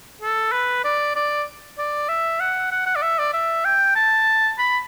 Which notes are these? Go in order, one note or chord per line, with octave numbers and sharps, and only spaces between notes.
A4
B4
D5
D5
D5
E5
F#5
F#5
F#5
D5
E5
D5
E5
G5
A5
B5